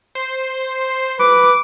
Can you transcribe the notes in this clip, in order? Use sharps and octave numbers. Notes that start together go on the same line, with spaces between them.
C5 C7
B4 D6